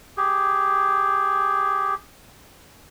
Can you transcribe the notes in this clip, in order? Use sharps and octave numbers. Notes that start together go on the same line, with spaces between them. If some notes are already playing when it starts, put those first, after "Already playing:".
G4 G#4